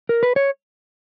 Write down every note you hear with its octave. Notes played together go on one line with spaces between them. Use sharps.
A#4
B4
C#5